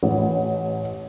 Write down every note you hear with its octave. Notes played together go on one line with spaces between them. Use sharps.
A1